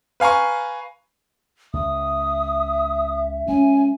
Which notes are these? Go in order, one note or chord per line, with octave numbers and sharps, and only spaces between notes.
B4 F5 G#5 A#5 C#6
C#2 E5 D#6
G#3 C#4 G#5